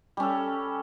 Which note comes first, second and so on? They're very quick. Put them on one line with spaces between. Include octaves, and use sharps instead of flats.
G3 C#4 A4